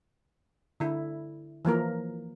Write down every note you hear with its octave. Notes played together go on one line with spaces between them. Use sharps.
D3 E4
E3 F3 A#3 A#4